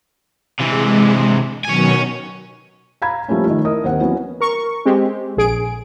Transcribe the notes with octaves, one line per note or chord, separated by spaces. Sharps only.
C3 E3 G#3
B2 D#3 F#3 C#5 G#5
F5 A#5 B5 G#6
F3 G3 A3 A#3 C#4
D#3 A3 F4
E4 A#4 D#5 D#6
D#2 C4 F#5
E3 F#3 A#3 B3 C#4
A#4 C#6
G#3 C4 G4
A#1 G#4 D7